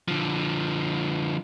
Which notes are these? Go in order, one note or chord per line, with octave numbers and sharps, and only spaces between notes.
D3 F3